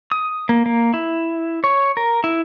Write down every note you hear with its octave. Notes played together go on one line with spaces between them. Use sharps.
D#6
A#3
A#3
E4
C#5
A#4
E4